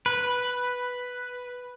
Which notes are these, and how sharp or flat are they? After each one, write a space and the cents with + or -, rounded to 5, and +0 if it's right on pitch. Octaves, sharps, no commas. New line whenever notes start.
B4 +0